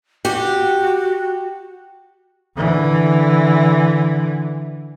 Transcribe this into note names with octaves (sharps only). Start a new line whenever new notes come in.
F#4 G4
D3 E3